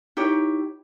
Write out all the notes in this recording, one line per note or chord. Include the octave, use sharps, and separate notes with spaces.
D#4 E4 G4 C#5